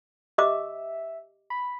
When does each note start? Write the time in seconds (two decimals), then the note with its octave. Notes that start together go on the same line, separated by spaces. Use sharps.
0.38 G4 D#5 E5 D6
1.50 B5